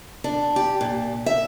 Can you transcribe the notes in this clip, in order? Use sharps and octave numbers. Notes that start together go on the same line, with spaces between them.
D4
G4
A#2
E5